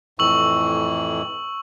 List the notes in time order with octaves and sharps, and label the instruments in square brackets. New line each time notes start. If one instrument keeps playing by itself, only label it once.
[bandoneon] F2 A2 E3 [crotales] C#6 E6 F#7